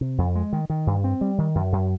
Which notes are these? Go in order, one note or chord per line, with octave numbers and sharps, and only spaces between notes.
C3
F2
G#3
D#3
D#3
G2
C4
G3
D#3
F#2
F#2